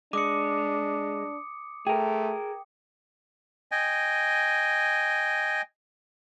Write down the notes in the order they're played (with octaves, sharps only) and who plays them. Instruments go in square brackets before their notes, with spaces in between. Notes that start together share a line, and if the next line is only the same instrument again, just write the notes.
[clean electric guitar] G#3 [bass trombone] D4 [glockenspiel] D6 D#6 C#7
[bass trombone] A3 [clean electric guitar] G#4 A#4 [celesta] G5
[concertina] D#5 G5 G#5